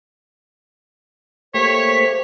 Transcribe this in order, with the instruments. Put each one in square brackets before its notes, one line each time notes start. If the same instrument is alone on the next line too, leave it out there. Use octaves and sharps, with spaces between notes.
[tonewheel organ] A3 A#3 G4 [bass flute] C5 [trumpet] C#5 [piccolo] B6